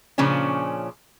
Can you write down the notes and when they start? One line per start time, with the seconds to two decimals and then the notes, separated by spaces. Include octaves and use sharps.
0.18 A#2 C#3 F3 C#4 D4